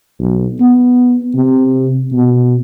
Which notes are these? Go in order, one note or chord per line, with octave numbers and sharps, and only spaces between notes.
B1
B3
C3
B2